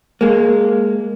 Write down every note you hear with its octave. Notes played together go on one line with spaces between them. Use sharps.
G#3 A#3